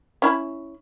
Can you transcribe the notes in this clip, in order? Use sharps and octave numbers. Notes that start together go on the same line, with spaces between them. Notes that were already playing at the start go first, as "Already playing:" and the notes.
C#4 E4 B5